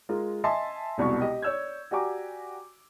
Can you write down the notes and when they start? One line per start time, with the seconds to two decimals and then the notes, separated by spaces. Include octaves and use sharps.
0.09 G#3 F4 A#4
0.44 D#5 E5 G#5 A5 C6
0.98 E1 C2 B2 C#6
1.20 G4 D#5
1.42 C#5 D5 E6 G6 G#6
1.91 F#4 G4 D5 G#5 A#5 D6